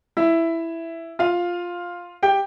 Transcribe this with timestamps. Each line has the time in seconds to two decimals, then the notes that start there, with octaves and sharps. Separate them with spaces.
0.17 E4 E5
1.19 F4 F5
2.23 G4 G5